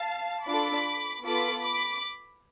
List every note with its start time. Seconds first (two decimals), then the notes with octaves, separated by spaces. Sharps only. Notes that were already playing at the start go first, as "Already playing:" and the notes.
Already playing: F5 A5
0.45 D4 F4 A4 B5 D6
1.23 B3 F4 A4 B5 D6
1.62 B5 D6